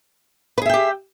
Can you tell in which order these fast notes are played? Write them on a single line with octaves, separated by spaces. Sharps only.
B4 G#4 E5 G5 G4